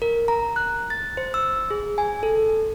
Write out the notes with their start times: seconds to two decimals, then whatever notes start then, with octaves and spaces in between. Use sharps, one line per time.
0.02 A#4
0.28 A#5
0.56 F#6
0.90 A6
1.17 C5
1.34 E6
1.71 G#4
1.98 G#5
2.23 A4